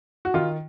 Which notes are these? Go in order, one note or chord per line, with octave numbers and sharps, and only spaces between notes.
F#4
D#3 F4